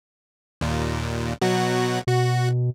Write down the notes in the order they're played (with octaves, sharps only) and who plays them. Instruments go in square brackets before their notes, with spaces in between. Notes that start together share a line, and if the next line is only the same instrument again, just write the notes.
[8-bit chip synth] D#2 A#2
B2 F#3 F#4
[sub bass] B2 [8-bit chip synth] F#4